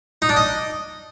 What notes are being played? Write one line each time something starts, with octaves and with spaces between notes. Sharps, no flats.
D#4
D4
D#5